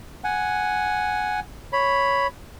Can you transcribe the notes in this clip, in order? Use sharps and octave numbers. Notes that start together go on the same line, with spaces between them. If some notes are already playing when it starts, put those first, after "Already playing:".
F#5 G#5
C#5 B5